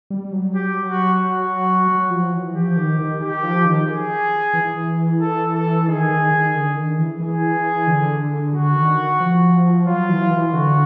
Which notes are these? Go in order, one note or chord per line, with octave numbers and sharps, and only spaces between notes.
G3
F#3
G4
F#4
F#4
F#3
F3
E3
F3 G4
D#3
D#3
D#3 G4
F3
D#3
G#4
E3
A4
A4
D#3 G#4
D#3
D#3
D3
D#3
E3
E3 G#4
D3
D3 F#4
D#3
F3
F#3 F4
E3
E3
D3 F#4